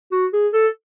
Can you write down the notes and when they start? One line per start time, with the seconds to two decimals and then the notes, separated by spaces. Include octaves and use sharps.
0.11 F#4
0.33 G#4
0.53 A4